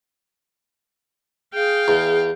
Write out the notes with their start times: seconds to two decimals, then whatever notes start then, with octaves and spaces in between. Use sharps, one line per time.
1.54 G#4 F5 G5
1.88 E2